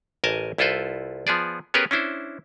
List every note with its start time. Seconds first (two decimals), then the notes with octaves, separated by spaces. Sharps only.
0.24 A1 A#4 D#5 G#5 A5
0.58 C2 E4 F4 A4 B4 C5
1.27 F3 B3 G#4 D5
1.74 B3 C#4 G4 G#4 A#4 B4
1.91 C#4 D4 E4 C5